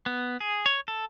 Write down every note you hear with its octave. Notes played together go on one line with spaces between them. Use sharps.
B3
G#4
C#5
A4